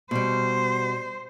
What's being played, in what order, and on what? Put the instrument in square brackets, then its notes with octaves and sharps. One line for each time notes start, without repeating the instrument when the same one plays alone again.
[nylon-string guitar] B2 G3 [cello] C5